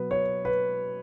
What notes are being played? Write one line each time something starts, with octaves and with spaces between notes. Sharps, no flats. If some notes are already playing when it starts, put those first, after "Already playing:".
Already playing: B2 F#3 B3 B4
C#5
B4